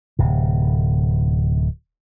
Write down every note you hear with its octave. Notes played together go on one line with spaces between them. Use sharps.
D1 C3